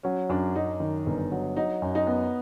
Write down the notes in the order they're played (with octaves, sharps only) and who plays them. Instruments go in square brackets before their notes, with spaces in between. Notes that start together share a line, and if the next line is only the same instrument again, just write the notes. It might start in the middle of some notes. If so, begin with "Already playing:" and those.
[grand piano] F#3 [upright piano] C#4
[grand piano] F#2 [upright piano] D4
[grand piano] F#2 [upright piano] D#4
[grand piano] D#3
G1
F#3
[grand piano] F#3 [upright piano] D#4
[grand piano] F#2
[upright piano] D#4
[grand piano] B3